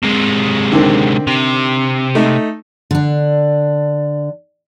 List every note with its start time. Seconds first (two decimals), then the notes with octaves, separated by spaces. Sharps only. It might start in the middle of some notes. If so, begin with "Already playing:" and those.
0.03 C3 G#3
0.72 D3 D#3 C4
1.27 C3
2.15 A3 D#4
2.91 D3 D4